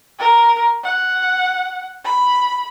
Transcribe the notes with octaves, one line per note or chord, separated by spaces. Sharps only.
A#4
F#5
B5